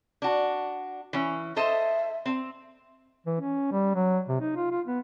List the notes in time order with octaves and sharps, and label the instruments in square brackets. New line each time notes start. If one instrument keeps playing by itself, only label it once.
[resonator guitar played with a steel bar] D4 F#4
E3 C#4
[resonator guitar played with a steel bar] A4 C5 D#5 [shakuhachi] E5
[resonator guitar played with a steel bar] C4
[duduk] E3
C#4
G3
F#3
C3
D#4
F4
F4
B3